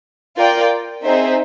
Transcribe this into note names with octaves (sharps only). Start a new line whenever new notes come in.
F4 A#4 D5 G5
C4 D#4 G#4 C5 E5